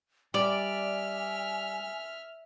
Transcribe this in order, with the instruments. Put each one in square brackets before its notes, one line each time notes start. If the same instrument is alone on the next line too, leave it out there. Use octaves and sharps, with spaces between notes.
[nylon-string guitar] G3 [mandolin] D5 [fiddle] E5 F6 [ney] G#5